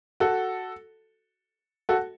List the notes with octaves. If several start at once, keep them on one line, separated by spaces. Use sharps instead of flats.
F#4 A4
F#4 A4